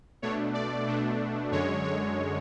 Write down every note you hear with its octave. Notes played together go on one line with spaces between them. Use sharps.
B2 A3 D4 C#5
D5
B2 A3 D4
F#2 D3 G#3 C#5
C#5